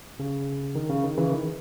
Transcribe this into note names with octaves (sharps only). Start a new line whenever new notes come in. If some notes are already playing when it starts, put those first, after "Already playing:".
C#3
D#3
C#3
D#3
C#3 E3
D#3